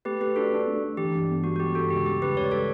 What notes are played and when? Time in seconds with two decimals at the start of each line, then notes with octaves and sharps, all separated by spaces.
0.05 A3 G4 B4
0.20 A3 G4 B4
0.36 D4 F#4 A4
0.52 D4
0.66 A3
0.82 D4
0.97 E3 G4
1.14 G2
1.29 B3
1.44 G3 F#4
1.56 F#4
1.60 G3 G4
1.75 G2 F#4 A4
1.90 C#2 G4
2.06 G3 G4
2.22 C#2 G4 B4
2.37 C#2 C#5
2.44 D5
2.51 G3 A4 C#5